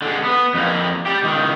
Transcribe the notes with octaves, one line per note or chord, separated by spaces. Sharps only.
D3 G#3
B3
F2 A#3
G3 G4
C#2 D#3